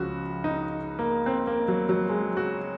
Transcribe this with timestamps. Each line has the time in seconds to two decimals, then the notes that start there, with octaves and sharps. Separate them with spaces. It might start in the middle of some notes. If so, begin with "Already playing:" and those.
Already playing: C#2 C#3 F3 F#4
0.44 D#4
0.99 A#3
1.26 C4
1.47 A#3
1.68 F#3
1.89 F#3
2.09 G#3
2.37 F#4